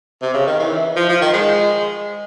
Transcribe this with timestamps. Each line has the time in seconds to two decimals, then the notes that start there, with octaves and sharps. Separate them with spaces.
0.22 C3
0.34 C#3
0.47 D#3
0.59 E3
0.96 F3
1.09 F3
1.22 D#3
1.34 G#3